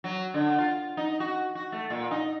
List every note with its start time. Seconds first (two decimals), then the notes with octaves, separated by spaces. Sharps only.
0.04 F#3
0.34 D3
0.58 F4
0.97 D#4
1.20 F#4
1.55 F#4
1.72 A3
1.90 A#2
2.11 D#4